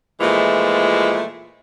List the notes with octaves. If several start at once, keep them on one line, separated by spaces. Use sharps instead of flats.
A#2 E3 F3 G#3 A3